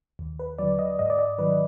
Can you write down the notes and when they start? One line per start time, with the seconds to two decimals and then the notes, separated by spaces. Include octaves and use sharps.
0.19 D#2
0.39 B4
0.58 D3 F#3 D5
0.79 D#5
0.99 G#2 D#5
1.10 D5
1.19 D#5
1.38 D#3 F#3 B4